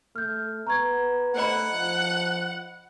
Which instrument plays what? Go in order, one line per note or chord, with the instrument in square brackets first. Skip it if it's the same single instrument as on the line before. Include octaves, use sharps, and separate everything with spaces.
[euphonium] A3 [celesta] F6 G6
[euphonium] B3 [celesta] A#5 C#6 G#6
[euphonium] A3 [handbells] C5 D#5 B5 [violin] F#5
[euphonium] F3